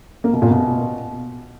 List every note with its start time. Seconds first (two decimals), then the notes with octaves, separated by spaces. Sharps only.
0.24 A#3
0.33 B2
0.42 A#2
0.50 B2